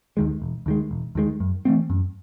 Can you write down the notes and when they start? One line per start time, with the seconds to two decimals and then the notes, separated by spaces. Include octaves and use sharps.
0.17 D#2 D#3 G#3
0.42 E1
0.66 D#2 D#3 G#3
0.91 E1
1.15 D#2 D#3 G#3
1.40 F#2
1.65 E3 A3 C4
1.90 F#2